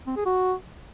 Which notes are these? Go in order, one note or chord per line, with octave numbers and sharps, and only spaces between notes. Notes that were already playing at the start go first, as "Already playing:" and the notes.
C4
G#4
F#4